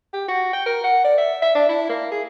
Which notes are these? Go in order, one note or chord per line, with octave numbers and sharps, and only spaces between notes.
G4
F#4
G5
A#4
F#5
D5
E5
E5
D4
E4
A#3
G#4